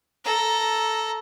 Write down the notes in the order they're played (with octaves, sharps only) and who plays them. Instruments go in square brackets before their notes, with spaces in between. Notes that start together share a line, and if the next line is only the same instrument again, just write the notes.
[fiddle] A4 A#5